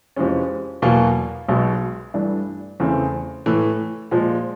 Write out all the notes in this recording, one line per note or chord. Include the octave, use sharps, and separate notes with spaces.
F2 C3 E3 G#3 C#4
E2 B2 F#3 A#3
B1 B2 G#3
G2 E3 A3 D4
E2 C#3 E3 A3 C4
A2 E3 A3
A#2 F3 G#3